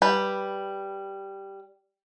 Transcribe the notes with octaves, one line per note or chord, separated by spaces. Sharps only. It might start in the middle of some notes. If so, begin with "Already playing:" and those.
G3 B4